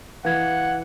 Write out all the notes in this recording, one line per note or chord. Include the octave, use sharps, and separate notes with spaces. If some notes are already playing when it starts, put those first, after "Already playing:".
E3 F5 F#5 G#6